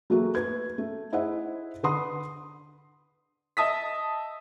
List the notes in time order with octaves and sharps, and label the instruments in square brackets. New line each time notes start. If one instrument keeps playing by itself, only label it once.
[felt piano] F#3 A3 A#3 F#4 G#4 A4
B4 G#6
A3
E4 G#4 C5 D#5 E5 F#5
D3 B4 F#5 B5 C6 D#6
[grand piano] D#5 E5 A5 D#6 B6